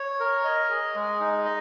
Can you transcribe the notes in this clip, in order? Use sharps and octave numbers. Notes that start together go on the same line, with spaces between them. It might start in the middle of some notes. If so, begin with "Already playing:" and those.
Already playing: C#5
A#4
D#5
G#4
G#3
D#4
D#5